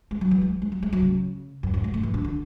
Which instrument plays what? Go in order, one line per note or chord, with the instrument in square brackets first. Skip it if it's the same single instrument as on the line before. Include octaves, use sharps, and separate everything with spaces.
[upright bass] G#3
F#3
E3
G#3
G#3
F#3
G#3
F#3
C#3
F#2
F#2
G#2
A2
E3
D3
D3